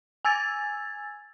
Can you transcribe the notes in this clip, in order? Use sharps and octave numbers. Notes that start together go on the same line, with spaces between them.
G#5 E6 G#6 A6